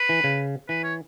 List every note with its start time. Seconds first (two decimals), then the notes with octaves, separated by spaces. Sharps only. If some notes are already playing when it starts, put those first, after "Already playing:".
Already playing: B4
0.09 E3
0.24 C#3
0.69 E3 B4
0.83 C#5